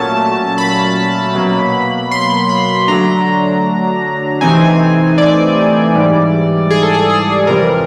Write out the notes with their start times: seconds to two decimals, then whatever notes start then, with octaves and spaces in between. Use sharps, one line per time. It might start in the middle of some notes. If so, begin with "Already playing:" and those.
Already playing: A#2 F#3 A3 C#4 A5
0.58 B5
1.35 B2 F#3 A#3
2.11 C6
2.49 B5
2.88 D3 F#3 A3 D4 A#5
4.41 C3 E3 A3 C4 D#4 G#5
5.18 D5
5.95 G#2 E3 G3
6.70 G#4
6.83 A4
6.94 G#4
7.10 G#4
7.47 F2 C3 E3 G3 A#4